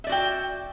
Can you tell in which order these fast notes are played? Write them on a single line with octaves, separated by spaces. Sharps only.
E5 D5 F#4 G5